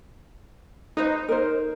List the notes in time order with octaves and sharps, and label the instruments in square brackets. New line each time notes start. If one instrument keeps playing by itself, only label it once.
[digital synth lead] D#4 [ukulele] B4 C5 D#5
[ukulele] A#4 C5